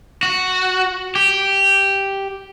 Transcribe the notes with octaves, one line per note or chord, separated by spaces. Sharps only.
F#4
G4